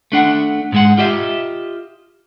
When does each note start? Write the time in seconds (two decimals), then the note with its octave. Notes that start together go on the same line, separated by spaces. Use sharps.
0.12 A3 D4 F#5
0.72 G#2 G#3 F#5
0.98 F4 G4 D#5 E5